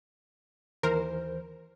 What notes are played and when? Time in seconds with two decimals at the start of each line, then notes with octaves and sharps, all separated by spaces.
0.83 D#2 E3 A#4 C5